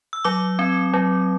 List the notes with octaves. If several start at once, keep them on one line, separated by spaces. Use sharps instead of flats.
E6
F#3 D6
C4
F#3